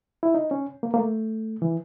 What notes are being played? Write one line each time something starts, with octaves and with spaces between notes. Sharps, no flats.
E4
D#4
C#4
A#3
A#3
A3
E3